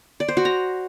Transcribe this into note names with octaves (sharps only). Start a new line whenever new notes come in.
D5
C5
F#4
A#5